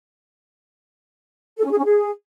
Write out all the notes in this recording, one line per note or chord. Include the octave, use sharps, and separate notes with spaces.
A4
C#4
G#4
C#4
G#4